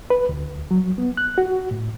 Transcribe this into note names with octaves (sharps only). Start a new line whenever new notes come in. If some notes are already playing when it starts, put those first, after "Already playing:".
B4
D2
F#3
B3
F#6
F#4
A2